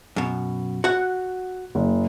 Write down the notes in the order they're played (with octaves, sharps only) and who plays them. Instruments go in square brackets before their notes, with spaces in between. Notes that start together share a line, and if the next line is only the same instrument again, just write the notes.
[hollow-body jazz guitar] F#2 B2
[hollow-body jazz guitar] F#4 F#5 [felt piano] F#6
[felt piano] F#1